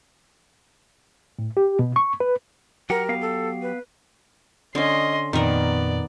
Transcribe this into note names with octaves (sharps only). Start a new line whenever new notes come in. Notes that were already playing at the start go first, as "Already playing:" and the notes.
A2
G4
B2
C#6
B4
F#3 G4 A#4 F#5
B3 F5
A4
B4
D3 C#4 D#5 C6
F2 A#2 D#3 B3 A#4 D5